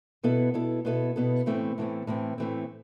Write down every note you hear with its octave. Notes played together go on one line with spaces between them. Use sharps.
B2 B3 E4 A4
B2 B3 E4 A4
B2 B3 E4 A4
B2 B3 E4 A4
A2 E3 A3 C4
A2 E3 A3 C4
A2 E3 A3 C4
A2 E3 A3 C4